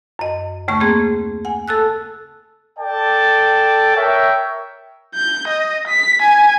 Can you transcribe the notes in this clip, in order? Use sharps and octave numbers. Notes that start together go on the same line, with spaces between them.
F#2 D#5
D#2 C#3 A3 C#6
A#3 C4 G#4
F#5 G#5
A4 A5 E6 F#6
A4 D5 G5 A5
A#4 C#5 E5 G5
G6
D#5
B6
G#5